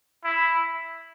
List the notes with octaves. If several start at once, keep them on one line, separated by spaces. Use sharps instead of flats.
E4